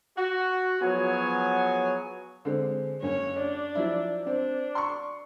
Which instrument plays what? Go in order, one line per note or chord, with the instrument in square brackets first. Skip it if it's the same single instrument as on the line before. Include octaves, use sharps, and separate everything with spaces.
[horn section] F#4
F3 F#3 B3 G#4 C#5 G#5
[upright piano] D3 G#3 C4
[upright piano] F#1 C#4 [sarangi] C#5
[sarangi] D4
[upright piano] F3 F#3 E4
[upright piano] C4 [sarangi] D4
[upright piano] C6 C#6